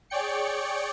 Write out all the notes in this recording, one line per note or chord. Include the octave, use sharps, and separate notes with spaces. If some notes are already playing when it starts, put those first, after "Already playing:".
G#4 C#5 D5 G5 C#7